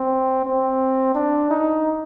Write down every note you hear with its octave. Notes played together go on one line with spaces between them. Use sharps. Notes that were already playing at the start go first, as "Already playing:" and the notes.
Already playing: C4
C4
D4
D#4